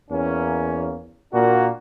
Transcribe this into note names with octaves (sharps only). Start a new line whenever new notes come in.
E2 A#3 C#4
A#2 A#3 D4 F#4